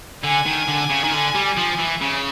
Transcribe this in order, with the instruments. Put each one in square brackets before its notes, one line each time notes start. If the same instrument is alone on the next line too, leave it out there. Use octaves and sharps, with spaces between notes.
[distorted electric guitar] D3 [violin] G#5
[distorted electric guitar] D#3
D3
C#3
D#3
D3
G3
F3
E3
C#3